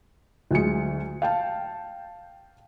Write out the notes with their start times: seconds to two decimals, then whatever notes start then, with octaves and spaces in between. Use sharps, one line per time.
0.51 D2 F#3 G#3 C#7
1.22 F5 G5 A5